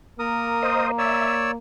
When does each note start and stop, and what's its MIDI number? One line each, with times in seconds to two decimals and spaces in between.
0.19 1.56 58
0.19 0.87 70
0.19 0.87 87
0.63 0.91 72
0.63 0.91 75
0.98 1.51 73
0.98 1.51 74
0.98 1.35 76
0.98 1.51 88